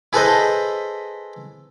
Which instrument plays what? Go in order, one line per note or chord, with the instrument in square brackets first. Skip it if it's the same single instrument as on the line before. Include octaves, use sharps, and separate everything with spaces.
[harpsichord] E4 G#4 A4 B4 C5 D#5